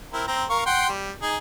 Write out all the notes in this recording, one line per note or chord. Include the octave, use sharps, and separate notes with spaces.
C4 E4 A#4
C4 A#5
A#4 F5 C#6
F#5 G5 C6
G3
D#4 G#4